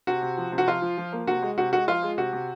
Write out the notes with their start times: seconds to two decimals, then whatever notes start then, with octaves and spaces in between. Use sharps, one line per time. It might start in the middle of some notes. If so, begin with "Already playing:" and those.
0.07 C3 F#4
0.22 C3
0.38 F3
0.52 C3
0.58 F#4
0.68 F3 F4
0.82 F3
0.98 F3
1.12 A#3
1.27 C3 F#4
1.42 G#3
1.58 C3 F#4
1.73 G#3 F#4
1.88 F3 F4
2.03 G#3
2.18 C3 F#4
2.33 C3